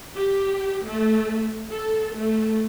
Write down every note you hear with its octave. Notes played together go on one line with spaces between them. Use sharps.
G4
A3
A4
A3